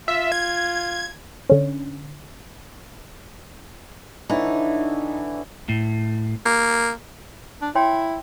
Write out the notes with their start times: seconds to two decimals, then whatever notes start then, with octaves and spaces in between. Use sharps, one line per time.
0.08 F4 E5
0.32 G#6
1.50 D3 C#4
4.29 D3 E3 D#4 C#5
5.69 A2
6.46 A#3
7.62 D4
7.75 E4 C#5 G5 C6